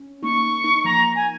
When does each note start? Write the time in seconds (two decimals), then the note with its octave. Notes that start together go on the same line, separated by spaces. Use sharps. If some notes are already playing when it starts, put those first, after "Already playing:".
Already playing: C#4
0.23 A#3 D#4 C#6
0.64 A#3 D#4
0.85 F3 A#3 A#5
1.15 G#5